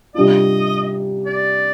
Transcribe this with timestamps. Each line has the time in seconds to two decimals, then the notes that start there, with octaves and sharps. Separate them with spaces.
0.14 C3 G3 D4 F4 D#5
1.26 D5